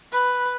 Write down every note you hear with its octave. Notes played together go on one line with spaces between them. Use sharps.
B4